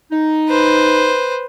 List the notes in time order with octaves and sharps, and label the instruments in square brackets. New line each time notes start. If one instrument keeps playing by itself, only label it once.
[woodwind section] D#4
[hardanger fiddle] B4 C5